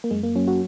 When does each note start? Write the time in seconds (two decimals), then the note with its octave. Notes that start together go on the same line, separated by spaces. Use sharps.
0.04 A#3
0.11 F#2 G#3
0.23 A#3
0.35 F#3 C#4
0.48 F#4